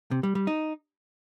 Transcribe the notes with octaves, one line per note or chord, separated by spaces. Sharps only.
C3
G3
G3
D#4